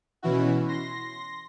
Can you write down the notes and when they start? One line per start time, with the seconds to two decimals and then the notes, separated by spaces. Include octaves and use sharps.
0.23 B2 E3 C#4 E4 F#4
0.68 C6 A#6